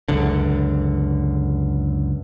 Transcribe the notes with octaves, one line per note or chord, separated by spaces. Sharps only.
C#2 F#2 D3